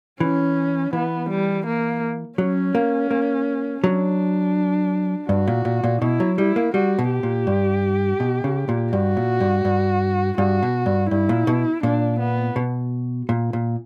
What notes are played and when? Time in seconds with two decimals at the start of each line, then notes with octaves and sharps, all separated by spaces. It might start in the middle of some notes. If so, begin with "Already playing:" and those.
0.20 E3 C#4
0.93 E3 B3
1.29 G3
1.66 A#3
2.38 F#3 C#4
2.75 A#3
3.11 A#3
3.83 F#3 D4
5.29 G2 F#4
5.47 A#2
5.65 A#2
5.84 A#2
6.01 B2 E4
6.20 F#3
6.38 G3 E4
6.56 A#3
6.74 G3 F#4
6.99 B2
7.11 G4
7.23 A#2
7.47 G2
8.20 B2
8.44 C#3
8.69 A#2
8.93 G2 F#4
9.17 A#2
9.40 G2
9.65 G2
10.38 G2 F#4
10.63 B2
10.86 G2
11.10 G2 E4
11.29 A#2
11.47 B2
11.83 A#2 D4
12.19 B3
12.56 B2
13.29 A#2
13.53 A#2